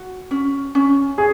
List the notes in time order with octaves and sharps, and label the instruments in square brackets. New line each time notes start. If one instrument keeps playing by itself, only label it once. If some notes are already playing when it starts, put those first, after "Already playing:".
Already playing: [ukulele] F#4
C#4
C#4
[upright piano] G#4